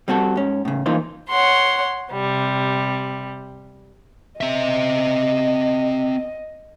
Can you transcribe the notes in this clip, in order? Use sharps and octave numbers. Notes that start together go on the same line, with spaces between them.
G3 C4 F#4 G#4 A4
G#2 C#4
A2 C#3
E3 A#3 D#4 F4 C5
C#5 F#5 C6
C3 G3
C4 D#5 E5